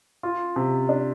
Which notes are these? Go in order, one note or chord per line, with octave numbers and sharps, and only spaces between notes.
F4
C3
D4